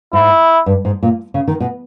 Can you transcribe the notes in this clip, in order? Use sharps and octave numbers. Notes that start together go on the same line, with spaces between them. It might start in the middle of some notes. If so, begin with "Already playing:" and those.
G#2 E4
G2
G#2
A#2
C#3
D#3
B2